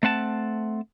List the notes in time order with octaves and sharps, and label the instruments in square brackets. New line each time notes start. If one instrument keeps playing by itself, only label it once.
[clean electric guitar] A3 C4 F#5 A5